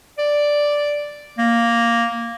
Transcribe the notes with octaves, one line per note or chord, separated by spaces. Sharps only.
D5
A#3